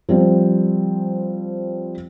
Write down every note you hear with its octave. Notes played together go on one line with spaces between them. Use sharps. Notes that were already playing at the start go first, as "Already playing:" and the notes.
F3 G3 C4